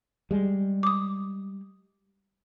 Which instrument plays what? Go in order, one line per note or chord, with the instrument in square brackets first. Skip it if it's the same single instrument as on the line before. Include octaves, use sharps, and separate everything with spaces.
[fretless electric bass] G3 G#3
[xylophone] D6 D#6